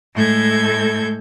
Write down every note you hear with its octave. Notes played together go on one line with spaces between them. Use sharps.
A2 G#3 A3 A4 G6 G#6